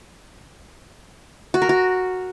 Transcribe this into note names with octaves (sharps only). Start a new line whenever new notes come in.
F#4
A#4
F#4